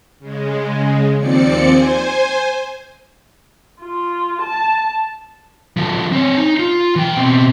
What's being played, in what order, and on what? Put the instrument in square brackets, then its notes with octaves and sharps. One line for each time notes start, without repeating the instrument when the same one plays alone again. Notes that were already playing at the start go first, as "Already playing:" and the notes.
[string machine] C#3 G#3
D#2 F3 C4 D5 C#7
C5 G#5
[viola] F4
A5
[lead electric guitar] D3 F3
C4 C#5
D#4
F4
E3 G5
B2 C4